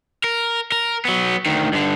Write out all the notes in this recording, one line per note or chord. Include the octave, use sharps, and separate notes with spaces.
A#4
A#4
F#3 B3
D2 D#3
G2 D3